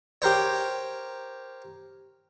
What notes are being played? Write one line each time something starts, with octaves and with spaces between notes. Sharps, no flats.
G4 A#4 C5 C#5